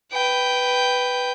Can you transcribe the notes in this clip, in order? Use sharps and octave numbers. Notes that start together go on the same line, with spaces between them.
B4 G5